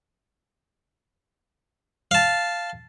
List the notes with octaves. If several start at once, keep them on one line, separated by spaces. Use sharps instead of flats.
F5 A5